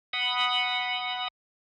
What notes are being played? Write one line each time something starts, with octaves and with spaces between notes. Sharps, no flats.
F#5 B5 D#6